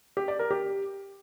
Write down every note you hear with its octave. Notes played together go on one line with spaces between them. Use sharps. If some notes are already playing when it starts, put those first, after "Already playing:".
G4
D5
A#4
G4